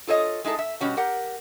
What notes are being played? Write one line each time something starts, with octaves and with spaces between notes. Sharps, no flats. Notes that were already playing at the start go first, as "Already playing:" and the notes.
F4 A4 C#5 D#5
G#3 D#4 E4 A4
E5
B2 G3 C#4 F#4
G4 A#4 F#5